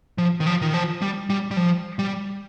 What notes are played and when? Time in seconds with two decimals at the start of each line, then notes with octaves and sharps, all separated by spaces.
0.18 F3
0.40 D#3
0.47 F3
0.62 D#3
0.74 F3
1.02 G3
1.30 G3
1.51 G3
1.57 F3
1.99 G3